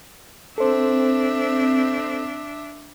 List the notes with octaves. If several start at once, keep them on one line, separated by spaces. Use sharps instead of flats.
C4 D4 A4 C5 E5